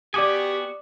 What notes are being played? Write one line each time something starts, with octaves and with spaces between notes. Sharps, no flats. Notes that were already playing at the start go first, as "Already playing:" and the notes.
B3 F#4 G4 D5 G#5 D6 D#6